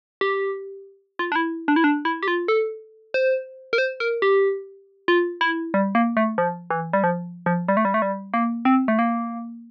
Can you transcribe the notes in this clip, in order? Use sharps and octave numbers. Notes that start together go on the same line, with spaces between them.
G4
F4
D4
E4
D4
E4
D4
E4
G4
F4
A4
C5
A#4
C5
A#4
G4
F4
E4
G3
A#3
A3
F3
E3
G3
F3
F3
G3
A3
G3
A3
G3
A#3
C4
A3
A#3